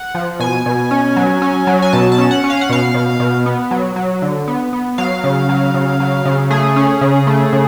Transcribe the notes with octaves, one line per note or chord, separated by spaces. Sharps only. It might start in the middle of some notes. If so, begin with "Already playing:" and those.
Already playing: F#5
F3
B2 G#5
B2
C#4
F#3
C#4
F#3
G#5
B2 A5
A5
C#4
F#5
C#4
F5
F#5
B2 F5
B2
B2
B3
F#3
F#3
D3
B3
B3
F#3 F5
C#3
F#3
C#3
F#3
C#3
A3 G#4
C#4
C#3
A3
C#3